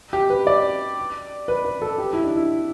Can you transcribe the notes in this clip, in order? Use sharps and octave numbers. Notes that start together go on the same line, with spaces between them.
G4
B4
D5
B4
B4
A4
G4
E4
D4
E4